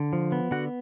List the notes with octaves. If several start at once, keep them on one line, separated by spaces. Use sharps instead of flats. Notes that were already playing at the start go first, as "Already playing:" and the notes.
Already playing: D3
F3
B3
D3 F#4 F#5